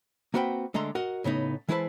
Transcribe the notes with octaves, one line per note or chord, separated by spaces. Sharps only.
A#3 C4 F#4 B4 F#5 G5
D3 G#3 A3 A#5 C6
F#4 A#4 D#5 F#5
A2 C#3 B3 D#4
E3 G#3 E4 B4 C5 A5